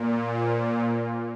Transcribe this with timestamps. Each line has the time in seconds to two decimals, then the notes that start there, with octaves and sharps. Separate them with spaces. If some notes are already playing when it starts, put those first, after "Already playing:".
Already playing: A#2
0.31 C5
0.59 A#4